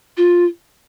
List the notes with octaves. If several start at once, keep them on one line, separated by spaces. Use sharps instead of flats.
F4